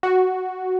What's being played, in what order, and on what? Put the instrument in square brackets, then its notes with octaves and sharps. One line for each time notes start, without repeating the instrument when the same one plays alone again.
[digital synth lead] F#4